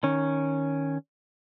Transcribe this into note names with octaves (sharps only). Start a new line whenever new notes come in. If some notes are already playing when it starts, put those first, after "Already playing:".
D#3 C#4